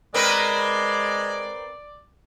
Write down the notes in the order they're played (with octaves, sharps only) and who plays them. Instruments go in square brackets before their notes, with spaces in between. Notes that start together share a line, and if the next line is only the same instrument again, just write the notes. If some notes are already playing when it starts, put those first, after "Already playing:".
[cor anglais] G#3 [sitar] C4 A#4 B4 [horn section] D5